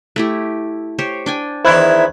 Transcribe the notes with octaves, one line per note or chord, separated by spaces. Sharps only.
A3 E4 G4
G4 C5 C#5
D4 G5 G#5
E2 D#3 E4 C5 F#6 G#6